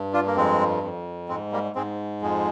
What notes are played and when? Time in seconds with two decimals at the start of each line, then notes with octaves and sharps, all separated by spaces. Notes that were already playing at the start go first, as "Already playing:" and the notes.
Already playing: G2
0.13 D4 F4
0.27 A#3
0.36 F2 G#3 C4
0.83 F2
1.29 G#2 G#3 C4
1.52 G3 A#3
1.75 G#2 G#3 C4
2.22 F2 F3 G#3